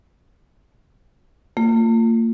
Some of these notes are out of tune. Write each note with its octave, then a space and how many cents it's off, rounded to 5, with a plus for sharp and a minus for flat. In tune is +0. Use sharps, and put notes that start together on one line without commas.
A#3 -40 F4 +0